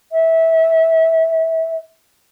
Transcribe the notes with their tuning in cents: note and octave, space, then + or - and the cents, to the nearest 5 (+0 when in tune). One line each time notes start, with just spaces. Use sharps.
E5 -20